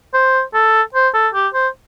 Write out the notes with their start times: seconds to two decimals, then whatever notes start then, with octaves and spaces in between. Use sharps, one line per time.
0.14 C5
0.54 A4
0.94 C5
1.14 A4
1.34 G4
1.54 C5